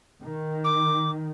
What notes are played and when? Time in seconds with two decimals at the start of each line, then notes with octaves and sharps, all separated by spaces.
0.22 D#3
0.64 D6